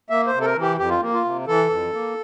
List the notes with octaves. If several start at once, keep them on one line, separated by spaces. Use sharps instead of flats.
A#3 E5
C5
C3
A4
A#4
E3
G4
F2 G4
F4
A#3
F4
C3
E3 A4
F2
A#3